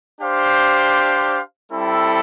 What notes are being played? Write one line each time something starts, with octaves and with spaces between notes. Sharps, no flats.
D4 G4 C5 F5
G3 C4 E4 A4